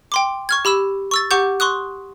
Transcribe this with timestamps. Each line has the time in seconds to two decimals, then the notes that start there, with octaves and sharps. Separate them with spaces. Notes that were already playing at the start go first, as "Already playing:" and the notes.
0.12 G5 C6 D6
0.49 C#6 F6 G#6
0.65 G4 B5 E6 E7
1.11 C#6 E6 A6
1.31 G4 F#5 C#6 D6 G6
1.60 C6 C#6 D#6 F#6